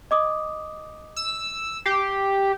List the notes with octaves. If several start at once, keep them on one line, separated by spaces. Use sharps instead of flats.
D#5 D6 D#6
E6
G4 C7